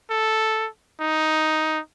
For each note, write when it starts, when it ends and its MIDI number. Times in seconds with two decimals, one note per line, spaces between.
0.10 0.68 69
1.00 1.80 63